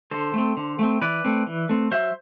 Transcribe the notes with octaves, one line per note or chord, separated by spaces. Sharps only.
D3 A4 C5
A3 C4
D3
A3 C4
E3 B4 D5
A3 C4
E3
A3 C4
F#3 C5 E5